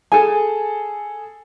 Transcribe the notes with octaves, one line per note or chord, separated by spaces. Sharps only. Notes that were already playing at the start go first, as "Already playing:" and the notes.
G#4 A4 G#5 A5